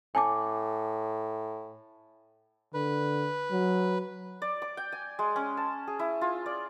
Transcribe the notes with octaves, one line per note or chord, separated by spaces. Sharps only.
A2 G#5 A5 D6
D3 B4
F#3
D5
D6
G5
G#5
G#3
C#4
A5
G#4
E4
F4
D5